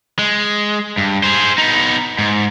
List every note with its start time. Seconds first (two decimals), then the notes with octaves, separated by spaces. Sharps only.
0.19 G#3
0.98 G2
1.23 G#4 C5
1.58 B3 D#4
2.19 G#2